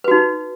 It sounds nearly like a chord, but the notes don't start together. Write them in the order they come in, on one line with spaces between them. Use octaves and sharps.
B4 F#4 D#4